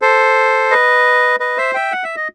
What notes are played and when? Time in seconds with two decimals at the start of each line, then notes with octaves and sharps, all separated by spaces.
0.02 A4 C5
0.71 B4 D#5
1.40 B4 D#5
1.58 C5 E5
1.74 E5 G5
1.92 F#5
2.04 E5
2.16 D#5